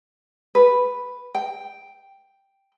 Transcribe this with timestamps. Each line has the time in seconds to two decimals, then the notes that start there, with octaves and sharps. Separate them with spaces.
0.55 B4
1.35 G5